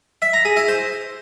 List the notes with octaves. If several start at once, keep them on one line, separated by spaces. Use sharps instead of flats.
E5
A#5
G#4
E4
C5